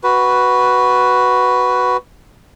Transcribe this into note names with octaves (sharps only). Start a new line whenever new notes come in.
F#4 B4